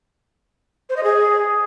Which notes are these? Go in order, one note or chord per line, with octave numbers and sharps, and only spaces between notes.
C5
D#5
G#4